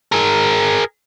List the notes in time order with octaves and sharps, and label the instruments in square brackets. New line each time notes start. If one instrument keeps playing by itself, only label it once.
[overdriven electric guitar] G#4 A#4